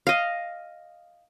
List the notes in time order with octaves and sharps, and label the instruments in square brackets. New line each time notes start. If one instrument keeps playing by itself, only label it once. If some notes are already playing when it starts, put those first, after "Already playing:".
[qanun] D#5 F5